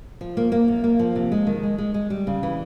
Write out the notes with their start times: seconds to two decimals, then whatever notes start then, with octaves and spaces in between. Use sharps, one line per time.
0.21 F3
0.37 A#3
0.52 A#3
0.68 F#2
0.84 A#3
0.99 F3
1.16 C3
1.32 G#3
1.47 D#3
1.63 G#3
1.78 G#3
1.94 G#3
2.10 G3
2.27 C#3
2.43 E3